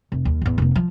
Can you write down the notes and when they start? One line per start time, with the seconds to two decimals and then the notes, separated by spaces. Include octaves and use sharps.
0.12 F1
0.25 D#2
0.42 A1 E2
0.58 F1 A#3
0.76 F3